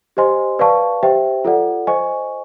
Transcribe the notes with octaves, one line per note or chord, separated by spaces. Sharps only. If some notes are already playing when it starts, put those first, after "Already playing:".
G4 C5 D#5 G#5 C6
B4 D5 F5 A5 C#6
G4 C5 E5 G5
F4 A4 D5 F#5
C5 D#5 G#5 C#6